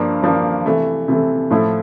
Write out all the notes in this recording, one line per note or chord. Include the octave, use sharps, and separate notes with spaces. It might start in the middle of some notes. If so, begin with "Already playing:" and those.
Already playing: G2 F3 A#3 D4
G2 F3 A#3 D4
C3 E3 A3
C3 E3 A3
A2 F3 A3 E4